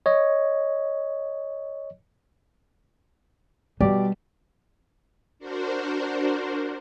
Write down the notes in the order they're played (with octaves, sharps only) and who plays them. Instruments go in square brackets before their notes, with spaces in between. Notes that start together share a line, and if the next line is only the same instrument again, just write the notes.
[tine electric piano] C#5 D#5
[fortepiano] B2 G4 D5 [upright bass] G3
[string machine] D4 F#4 A#4 C5